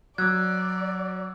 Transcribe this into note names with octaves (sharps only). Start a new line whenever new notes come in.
F#3 D5 D6 E6 F#6 G#6